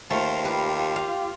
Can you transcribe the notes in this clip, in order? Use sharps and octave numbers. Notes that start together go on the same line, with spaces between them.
D#2 A3 F4 C5 F5
F4 G4 B4
F5